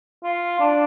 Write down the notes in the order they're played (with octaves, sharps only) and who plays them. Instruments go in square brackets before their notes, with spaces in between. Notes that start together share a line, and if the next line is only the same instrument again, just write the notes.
[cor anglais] F4
D4